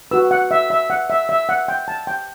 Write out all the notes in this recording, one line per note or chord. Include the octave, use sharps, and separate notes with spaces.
F#4 B4 E6
F#5
E5
E5
F#5
E5
E5
F#5
G5
A5
G5